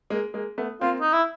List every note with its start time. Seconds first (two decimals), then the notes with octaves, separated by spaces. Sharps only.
0.10 G#3 A#3
0.34 G#3 A#3
0.58 A3 B3
0.81 A#3 C4 F4
1.01 D#4
1.13 E4